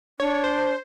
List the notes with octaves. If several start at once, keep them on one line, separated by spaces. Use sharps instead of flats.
D4 C#5
C5